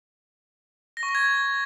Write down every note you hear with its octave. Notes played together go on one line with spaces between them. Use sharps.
A#6
C#6
A#6
G#6